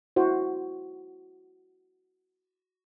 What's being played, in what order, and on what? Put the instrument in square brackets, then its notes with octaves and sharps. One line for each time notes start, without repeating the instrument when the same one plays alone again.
[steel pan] E4 F#4 C5